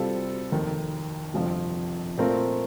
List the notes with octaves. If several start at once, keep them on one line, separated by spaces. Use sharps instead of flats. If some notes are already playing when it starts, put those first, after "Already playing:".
Already playing: C3 G3 C4 F4 A4
F1 D#2 D#3
G1 F2 C3 F3
A#2 A3 C4 F4 A#4